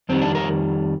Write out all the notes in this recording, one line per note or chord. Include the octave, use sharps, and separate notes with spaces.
F2 D#3 G3 C4
D4
A#4